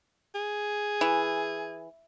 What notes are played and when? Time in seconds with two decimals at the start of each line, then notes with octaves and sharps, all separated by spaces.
0.35 G#4
1.01 E3